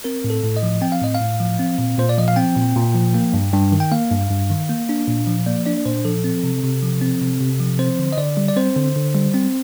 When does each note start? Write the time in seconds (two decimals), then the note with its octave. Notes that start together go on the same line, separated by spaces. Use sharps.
0.04 C4 A#4
0.24 A2
0.30 A4
0.43 A2
0.57 D#5
0.63 F3
0.81 C4 G5
0.92 F5
1.02 A2 D#5
1.14 F5
1.20 A2
1.40 F3
1.59 C4
1.78 A#2
1.98 A#2 C5
2.09 D5
2.18 F3 D#5
2.28 F5
2.36 C4 G5
2.56 A#2
2.76 A#2
2.95 F3
3.14 A#3
3.34 G2
3.53 G2
3.72 D#3
3.80 G5
3.92 A#3 F5
4.11 G2
4.30 G2
4.50 D#3
4.69 A#3
4.89 D4
5.08 A#2
5.27 F3
5.46 A#3 D5
5.66 D4 D5
5.77 D5
5.86 A#2 C5
6.05 F3 A4
6.24 C4
6.44 C3
6.64 C3
6.83 F3
7.02 C4
7.21 C3
7.41 C3
7.60 F3
7.79 C4 C5
7.99 D3
8.13 D#5
8.18 D3 D5
8.37 G3
8.48 D5
8.56 C4 C5
8.76 D3
8.96 D3
9.15 G3
9.34 C4